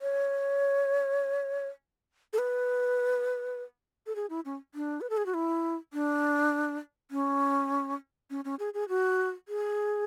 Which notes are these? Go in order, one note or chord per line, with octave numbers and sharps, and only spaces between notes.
C#5
A4
B4
A4
G#4
E4
C#4
D4
B4
A4
G#4
F#4
E4
D4
C#4
C#4
C#4
G#4
G#4
F#4
G#4